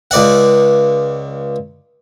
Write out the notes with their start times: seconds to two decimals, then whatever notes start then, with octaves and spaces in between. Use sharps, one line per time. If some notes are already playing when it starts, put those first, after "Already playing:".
0.11 C#2 D5 F#5